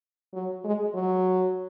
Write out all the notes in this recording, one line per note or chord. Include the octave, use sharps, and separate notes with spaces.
F#3
G#3
F#3